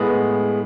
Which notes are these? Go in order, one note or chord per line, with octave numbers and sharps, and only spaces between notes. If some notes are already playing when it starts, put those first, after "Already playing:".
Already playing: A2 G#3 B3